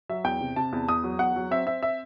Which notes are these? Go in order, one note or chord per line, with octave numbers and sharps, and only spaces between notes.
F#3 E5
E2 G5
C3
C3 A5
E2
E2 D#6
F#3
E2 F#5
F#3
C4 E5
C4 E5
E5